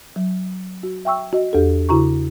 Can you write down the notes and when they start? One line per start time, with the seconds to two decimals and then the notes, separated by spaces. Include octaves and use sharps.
0.16 F#3
0.83 F#4
1.05 E5 G5 C#6 E6
1.33 F#4 D#5
1.53 E2 G4 A4
1.89 C#3 E4 F#4 A#5 C#6